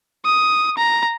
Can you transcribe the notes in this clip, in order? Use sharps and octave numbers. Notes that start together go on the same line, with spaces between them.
D#6
A#5